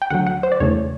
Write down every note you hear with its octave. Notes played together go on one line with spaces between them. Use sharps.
G5
D2 D3 F#3 F#5
F#5
C5
D5
E2 C#3 E3 A3 C#5